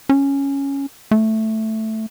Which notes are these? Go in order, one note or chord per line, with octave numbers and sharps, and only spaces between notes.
C#4
A3